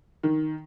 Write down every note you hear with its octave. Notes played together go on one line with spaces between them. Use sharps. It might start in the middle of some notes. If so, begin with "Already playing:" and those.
D#3